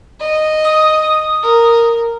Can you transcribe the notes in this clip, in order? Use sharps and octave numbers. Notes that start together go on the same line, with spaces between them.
D#5
D#6
A#4